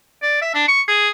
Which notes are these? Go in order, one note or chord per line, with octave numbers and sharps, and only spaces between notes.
D5
E5
D4
C#6
G#4